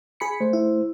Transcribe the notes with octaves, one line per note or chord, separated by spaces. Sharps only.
G#4 B5 C#7
A3 C5
E4